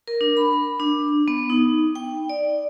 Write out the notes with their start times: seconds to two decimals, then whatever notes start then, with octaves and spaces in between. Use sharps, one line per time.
0.07 A#4
0.21 D4
0.37 B5
0.80 D4
1.28 B3
1.50 D#4
1.95 G5
2.30 D5